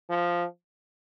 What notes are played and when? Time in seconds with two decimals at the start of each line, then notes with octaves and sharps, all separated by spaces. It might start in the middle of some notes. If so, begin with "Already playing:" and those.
0.09 F3